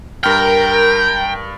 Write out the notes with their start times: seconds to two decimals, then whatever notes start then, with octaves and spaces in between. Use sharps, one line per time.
0.23 G2 A#4 G5 F6